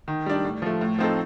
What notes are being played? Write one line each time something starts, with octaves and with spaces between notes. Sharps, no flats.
D#3
G3 D4
A2
F3 A3
A2
F3 C4 D#4 A4